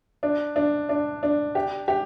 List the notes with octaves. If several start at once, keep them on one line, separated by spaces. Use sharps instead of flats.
D4
D4
D4
D4
G4
G4